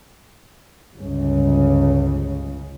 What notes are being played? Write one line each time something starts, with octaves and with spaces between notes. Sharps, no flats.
G1 C#2 C#3